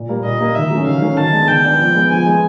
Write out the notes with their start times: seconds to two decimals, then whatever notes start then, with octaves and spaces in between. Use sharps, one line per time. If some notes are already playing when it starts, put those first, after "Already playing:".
Already playing: A#2
0.09 G3 A#3
0.24 A#2 D#5
0.39 G3 A#3
0.55 D#3 E5
0.71 F#3 A3 C#4
0.86 D#3 F5
1.02 F#3 A3 C#4
1.17 D#3 A5
1.33 G#3 B3 D4
1.48 D#3 G5
1.64 G#3 B3 D4
1.79 F3
1.95 G#3 B3
2.10 F3 G#5
2.26 G#3 B3